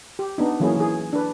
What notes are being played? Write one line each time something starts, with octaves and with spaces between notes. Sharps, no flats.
G4
B3 D4 D#4
E3 F#3 A#3 C#4 E4 G#4
E3 G#4
D4 B4